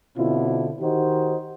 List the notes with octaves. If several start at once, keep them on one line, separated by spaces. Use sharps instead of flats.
B2 D3 C4 E4 F4
D#3 D#4 F#4 G4 C5